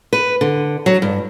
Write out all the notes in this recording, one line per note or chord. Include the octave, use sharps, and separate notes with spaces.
B4
D3
F#3
G2